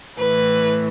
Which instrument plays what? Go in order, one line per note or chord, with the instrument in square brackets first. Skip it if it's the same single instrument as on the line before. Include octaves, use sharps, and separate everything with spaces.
[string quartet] A2 E3 B4